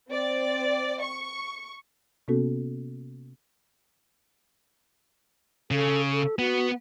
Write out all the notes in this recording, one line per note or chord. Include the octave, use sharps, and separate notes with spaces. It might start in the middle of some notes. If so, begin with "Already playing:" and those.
C4 D5
C#6
C3 A#3 B3 C#4 F#4 A4
C#3 A4
A4
B3 F#4